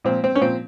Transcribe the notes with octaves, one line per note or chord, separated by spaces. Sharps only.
A#2 F3 C4
C4
C#4
A#2 F3 C4